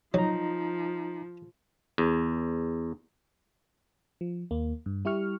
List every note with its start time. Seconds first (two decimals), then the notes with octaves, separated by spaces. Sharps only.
0.14 F3 F#3 D#4 A#5
1.98 E2
4.21 F3
4.51 D#2 A#3
4.86 G2
5.05 G3 E4 G4 C#6 F6